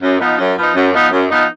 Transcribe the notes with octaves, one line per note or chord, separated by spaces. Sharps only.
F#2
F3 B3 D#4
F#2
F3 B3 D#4
F#2
F3 B3 D#4
F#2
F3 B3 D#4